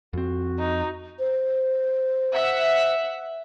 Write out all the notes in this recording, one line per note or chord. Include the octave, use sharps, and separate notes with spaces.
F2 C4 F#4
D#4
C5
E5 F#5